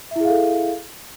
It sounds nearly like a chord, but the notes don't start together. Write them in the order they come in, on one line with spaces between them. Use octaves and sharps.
E5 E4 G#4 F5 A4